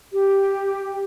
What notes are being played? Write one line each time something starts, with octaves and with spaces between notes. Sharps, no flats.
G4